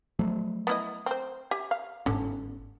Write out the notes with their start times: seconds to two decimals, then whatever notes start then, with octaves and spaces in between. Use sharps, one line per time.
0.19 F3 F#3 A3
0.67 B3 E4 D#5
1.06 C4 C5
1.51 G4 E5 G#5
1.71 F5
2.06 G1 G#2 D3 C#4